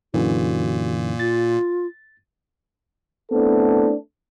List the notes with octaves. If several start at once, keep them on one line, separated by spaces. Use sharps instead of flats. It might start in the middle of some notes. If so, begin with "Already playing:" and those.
F#2 A#2 D3 E3 F#4
F4 A6
A3 B3 C4 D4 E4 A4